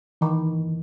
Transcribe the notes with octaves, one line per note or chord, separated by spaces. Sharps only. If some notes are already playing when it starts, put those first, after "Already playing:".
D#3 E3